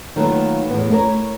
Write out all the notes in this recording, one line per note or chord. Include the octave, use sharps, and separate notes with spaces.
D#3 F#3 A3 A#3 F4 B4
E2 A2 B3
A3 E4 A4 A#4 C#5